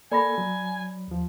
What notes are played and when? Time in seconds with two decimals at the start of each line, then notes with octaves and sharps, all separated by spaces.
0.12 A#3 A4 D5 G#5 B5 A#6
0.38 F#3
1.08 D#2 F3